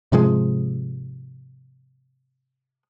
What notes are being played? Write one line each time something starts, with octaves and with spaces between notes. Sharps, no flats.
G#2 C3 F3 G#3